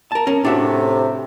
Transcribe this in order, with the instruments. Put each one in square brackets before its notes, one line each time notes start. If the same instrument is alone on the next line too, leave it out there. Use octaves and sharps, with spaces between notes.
[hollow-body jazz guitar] A#4 A5
C#4 A#4
[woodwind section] A2 C3 [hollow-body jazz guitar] D4 F#4 E5